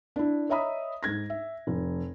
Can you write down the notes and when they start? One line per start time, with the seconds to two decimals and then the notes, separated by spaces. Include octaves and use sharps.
0.16 D4 E4
0.49 C#5 D#5 E5 A#5 B5 D#6
1.03 G#2 G#6 A#6
1.30 E5
1.67 F1